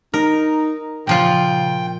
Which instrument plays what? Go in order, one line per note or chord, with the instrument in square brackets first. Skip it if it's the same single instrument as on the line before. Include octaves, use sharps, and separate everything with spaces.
[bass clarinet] D#4 [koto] A#4
[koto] A#2 F3 F4 [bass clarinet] C#3 [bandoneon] G5